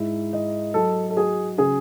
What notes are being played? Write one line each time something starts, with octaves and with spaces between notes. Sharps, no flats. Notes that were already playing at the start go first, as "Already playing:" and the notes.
Already playing: G#2 E4
D#5
F#3 A4
A4
F#4 G#4
C#3 G#4